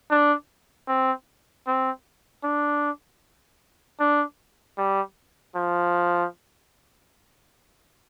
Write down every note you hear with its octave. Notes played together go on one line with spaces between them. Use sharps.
D4
C4
C4
D4
D4
G3
F3